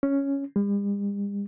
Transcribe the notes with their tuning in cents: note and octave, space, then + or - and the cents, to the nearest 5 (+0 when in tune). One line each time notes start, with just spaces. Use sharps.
C#4 +0
G3 +45